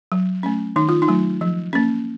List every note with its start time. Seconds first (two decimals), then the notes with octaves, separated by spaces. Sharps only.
0.12 F#3
0.43 A3 C#4
0.76 D#3 D#4
0.89 F4
1.02 D#4
1.08 F#3 A3
1.41 F3
1.73 A#3 C#4